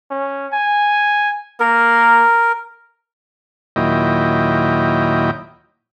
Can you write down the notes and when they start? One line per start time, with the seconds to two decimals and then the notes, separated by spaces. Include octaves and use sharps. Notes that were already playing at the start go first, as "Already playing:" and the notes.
0.10 C#4
0.53 G#5
1.60 A#3 A#4
3.76 D#2 A#2 F#3 E4 D#5 G5